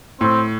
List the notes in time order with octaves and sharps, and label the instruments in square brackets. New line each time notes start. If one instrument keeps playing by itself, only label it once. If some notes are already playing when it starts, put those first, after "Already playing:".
[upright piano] A2 [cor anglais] C4